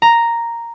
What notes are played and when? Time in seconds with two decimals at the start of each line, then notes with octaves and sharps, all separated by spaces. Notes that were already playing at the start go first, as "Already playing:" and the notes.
0.02 A#5